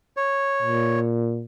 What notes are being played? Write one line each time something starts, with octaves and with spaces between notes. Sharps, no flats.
C#5
A#2